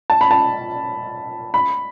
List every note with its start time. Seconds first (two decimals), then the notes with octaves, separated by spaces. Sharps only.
0.10 A5
0.21 B5
0.31 A5
1.54 B5